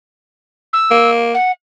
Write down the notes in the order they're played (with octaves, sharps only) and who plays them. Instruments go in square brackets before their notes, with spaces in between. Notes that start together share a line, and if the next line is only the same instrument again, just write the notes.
[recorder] E6
[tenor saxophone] A#3
[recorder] F#5